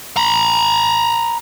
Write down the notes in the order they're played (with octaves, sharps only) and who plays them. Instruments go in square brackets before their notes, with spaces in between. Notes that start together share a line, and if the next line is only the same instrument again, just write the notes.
[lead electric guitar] A#5 B5